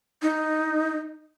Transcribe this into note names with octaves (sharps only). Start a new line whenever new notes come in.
D#4